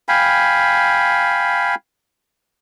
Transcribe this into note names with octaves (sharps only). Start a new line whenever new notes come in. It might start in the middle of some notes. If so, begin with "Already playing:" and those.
F5 G5 G#5 B5